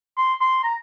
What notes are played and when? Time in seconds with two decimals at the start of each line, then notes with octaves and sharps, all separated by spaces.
0.18 C6
0.41 C6
0.63 A#5